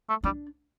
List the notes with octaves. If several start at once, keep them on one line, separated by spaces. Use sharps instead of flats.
A3
G3 D4